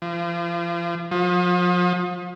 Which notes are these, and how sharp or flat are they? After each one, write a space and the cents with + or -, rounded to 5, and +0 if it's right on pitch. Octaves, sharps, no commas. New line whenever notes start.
F3 -35
F3 +35